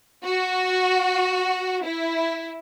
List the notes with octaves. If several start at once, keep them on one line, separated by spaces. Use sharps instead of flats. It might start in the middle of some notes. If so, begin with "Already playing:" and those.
F#4
E4